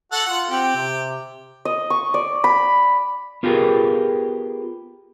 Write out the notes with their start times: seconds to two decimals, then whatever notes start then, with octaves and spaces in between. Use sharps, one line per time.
0.12 F#4 A4 F#5
0.26 F4 F#5
0.50 C4 G4
0.76 C3
1.65 D#5
1.90 C#6
2.14 D5
2.44 B5
3.43 B3 F4 G4 G#4 A#4